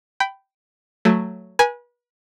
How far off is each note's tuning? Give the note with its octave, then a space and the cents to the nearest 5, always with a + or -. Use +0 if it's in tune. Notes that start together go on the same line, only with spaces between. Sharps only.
G5 -10 B5 +15
F#3 +0 A3 +10
B4 -35 G#5 +0